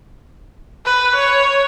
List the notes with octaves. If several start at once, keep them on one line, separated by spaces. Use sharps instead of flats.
B4
C#5